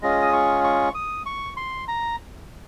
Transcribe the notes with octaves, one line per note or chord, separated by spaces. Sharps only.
G#3 C#4 F4 G#4 D#5
D#6
C#6
C#6
D#6
C#6
C6
A#5